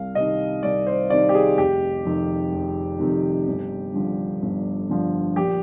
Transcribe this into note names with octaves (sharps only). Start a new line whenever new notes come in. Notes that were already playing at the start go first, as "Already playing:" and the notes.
Already playing: C2 F5
C3 D#5
D#3
C2 D5
C5
C3 D#3 D5
G4
G#4
F1 G4
F2 C3 D#3
F1
F2 C3 D#3
G1
G2 D3 F3
G1
G2 D3 F3
A#1 G4